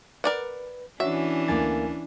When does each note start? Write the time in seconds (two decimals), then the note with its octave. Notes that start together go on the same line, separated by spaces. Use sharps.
0.24 A#4 B4 D5 F#5
1.00 E3 C#4 D4 F#4 C#5 E5
1.48 D2 A3 A#3 D5 G#5 A6